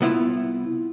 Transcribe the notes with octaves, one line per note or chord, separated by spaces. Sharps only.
C2 B3 E4 F4